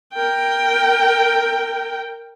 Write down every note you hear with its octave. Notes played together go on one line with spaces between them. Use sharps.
A#4 G5